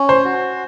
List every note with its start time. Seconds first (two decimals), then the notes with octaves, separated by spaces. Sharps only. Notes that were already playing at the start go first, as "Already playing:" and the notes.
Already playing: C#4
0.09 C5
0.25 F#4